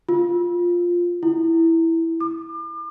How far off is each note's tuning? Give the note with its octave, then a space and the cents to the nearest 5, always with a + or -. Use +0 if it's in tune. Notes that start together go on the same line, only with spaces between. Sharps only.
F4 +5
E4 +0
D6 +40